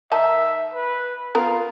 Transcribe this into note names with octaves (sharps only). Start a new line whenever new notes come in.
D#3 D#4 E5 A5
B4
B3 F4 A#4